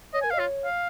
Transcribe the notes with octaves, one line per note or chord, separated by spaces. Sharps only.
C#5 D#5
A#4 G#5
F5
D#5
F4 C#5
F5